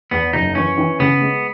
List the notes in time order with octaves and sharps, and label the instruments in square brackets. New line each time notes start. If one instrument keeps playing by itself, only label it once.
[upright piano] E2 [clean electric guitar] B3
[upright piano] F#1 [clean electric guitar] D#4
[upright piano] E3 [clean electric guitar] C#4
[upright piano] E3
[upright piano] C#3 [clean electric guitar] B3
[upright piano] G#3